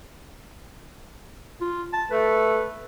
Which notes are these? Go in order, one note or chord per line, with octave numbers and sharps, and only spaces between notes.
F4
A5
A3 B4